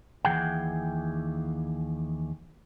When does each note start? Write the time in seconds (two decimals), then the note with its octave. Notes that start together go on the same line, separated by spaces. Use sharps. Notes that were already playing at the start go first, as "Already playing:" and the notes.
0.25 D#2 E3 G#4 F#5 G5